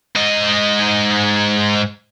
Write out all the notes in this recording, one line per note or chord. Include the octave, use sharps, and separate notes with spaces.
G#2 D#5